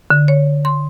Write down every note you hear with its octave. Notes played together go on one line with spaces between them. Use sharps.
D3
C#5
C6